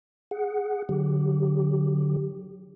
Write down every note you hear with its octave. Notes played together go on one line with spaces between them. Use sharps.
G#4 F#5
D3 F#3 G4